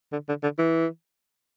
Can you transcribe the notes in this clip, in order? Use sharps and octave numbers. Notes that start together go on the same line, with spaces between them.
D3
D3
D3
E3